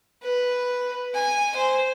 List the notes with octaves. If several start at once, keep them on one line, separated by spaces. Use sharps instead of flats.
B4
G#5
C5